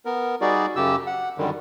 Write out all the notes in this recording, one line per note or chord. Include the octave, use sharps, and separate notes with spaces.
B3 A#4
G3 D#4 F#4 G#4 D5
F#2 C#3 G4 E6
F#5
F#2 D3 D#3 G3